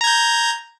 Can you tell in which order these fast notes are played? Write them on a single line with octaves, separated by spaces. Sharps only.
A#5 G#6 G6